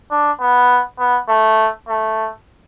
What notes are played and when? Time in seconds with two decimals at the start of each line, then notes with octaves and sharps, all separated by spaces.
0.11 D4
0.40 B3
0.99 B3
1.29 A3
1.88 A3